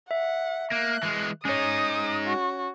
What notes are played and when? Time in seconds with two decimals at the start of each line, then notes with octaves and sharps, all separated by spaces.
0.11 E5 F#5
0.72 A#3 F#6
1.03 E3 G#3
1.45 G#3 C#4 D#4 C#5 D#6
2.26 F#4